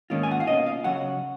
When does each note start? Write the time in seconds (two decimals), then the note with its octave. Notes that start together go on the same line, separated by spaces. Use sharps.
0.10 G#2 D#3 A#3 C#4 F4
0.23 G#5
0.31 F#5
0.40 F5
0.47 B2 A#3 C#4 F4 D#5
0.66 F5
0.84 C#3 F#3 C#4 F#5